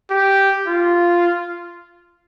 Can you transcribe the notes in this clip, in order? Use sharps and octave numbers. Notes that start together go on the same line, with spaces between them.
G4
F4